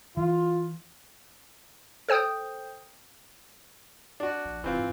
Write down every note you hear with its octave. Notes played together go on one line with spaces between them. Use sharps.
E3 F4
A4 C5 G5 D#6 G6
D4 F#4
A#1
F1 E3 C4 F4
G#2